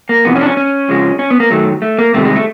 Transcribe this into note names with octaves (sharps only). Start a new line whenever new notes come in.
A#3
F2 C3 E3 B3
C#4
D4
C#4
C#4
F2 C#3 F3 G#3
C#4
B3
A#3
F#2 D#3 F#3 A3
A3
A#3
E2 C3 D#3 G3 A3
G#3
A3